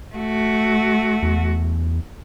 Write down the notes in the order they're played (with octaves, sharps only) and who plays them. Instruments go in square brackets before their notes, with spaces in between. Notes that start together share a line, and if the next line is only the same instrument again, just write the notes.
[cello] A3 F#4
[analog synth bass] E2